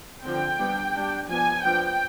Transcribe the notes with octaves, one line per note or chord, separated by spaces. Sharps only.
D3 F3 C4 G5
G3 B3 D4
G3 D4
F3 B3 D4 G#5
F3 B3 D4 G5